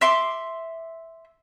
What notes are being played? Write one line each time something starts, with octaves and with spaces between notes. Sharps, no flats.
E5 C6 D6